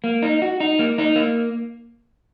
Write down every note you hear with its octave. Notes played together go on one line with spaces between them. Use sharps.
A#3
D#4
F#4
D#4
A#3
D#4
A#3